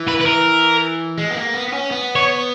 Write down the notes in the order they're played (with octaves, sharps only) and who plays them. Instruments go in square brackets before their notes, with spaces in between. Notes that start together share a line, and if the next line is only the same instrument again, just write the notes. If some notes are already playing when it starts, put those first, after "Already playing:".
Already playing: [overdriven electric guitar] E3
[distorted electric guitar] B4
B4
A#4
[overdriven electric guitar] G#3
B3
A#3
B3
B3
C#4
B3
[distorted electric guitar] C#5